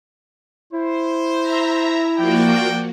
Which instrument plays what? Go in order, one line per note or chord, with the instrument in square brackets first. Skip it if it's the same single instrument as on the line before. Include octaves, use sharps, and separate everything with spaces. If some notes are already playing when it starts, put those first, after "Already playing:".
[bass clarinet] E4 [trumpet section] C5
[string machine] E5 A#5
[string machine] F3 A#3 F#4 [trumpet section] D5 G5